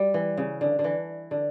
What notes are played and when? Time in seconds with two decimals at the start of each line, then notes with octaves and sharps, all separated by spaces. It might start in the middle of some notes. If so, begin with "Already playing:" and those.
Already playing: G3
0.14 E3
0.38 C#3
0.61 D3
0.79 D3
0.84 E3
1.31 D3